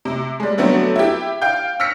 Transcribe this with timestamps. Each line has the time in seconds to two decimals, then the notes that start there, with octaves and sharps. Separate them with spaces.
0.05 C3
0.40 G3 G#3
0.58 D3 F#3 A3 B3 C4
0.96 E4 G4
1.41 F5 G5 G6
1.80 E6 F6 A#6 B6 C#7